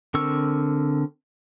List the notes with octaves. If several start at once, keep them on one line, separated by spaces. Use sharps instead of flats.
D3 C4 A#4 C#6 E6